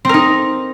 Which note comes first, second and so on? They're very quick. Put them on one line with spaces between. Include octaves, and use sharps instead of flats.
C4 A#4 D#4